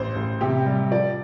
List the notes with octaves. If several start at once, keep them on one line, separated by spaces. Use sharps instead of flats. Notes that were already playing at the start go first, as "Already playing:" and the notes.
Already playing: A1 C5
A1
C3 G4
G3
F3 D5